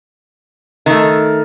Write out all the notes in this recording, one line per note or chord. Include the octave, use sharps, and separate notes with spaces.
D#3 A3